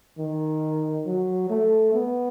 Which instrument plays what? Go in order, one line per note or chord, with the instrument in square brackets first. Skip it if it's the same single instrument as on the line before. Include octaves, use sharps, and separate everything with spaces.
[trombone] D#3
F#3
A3
B3